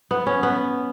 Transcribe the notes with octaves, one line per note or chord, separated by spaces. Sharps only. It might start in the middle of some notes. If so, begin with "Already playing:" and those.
B3
C#4
B3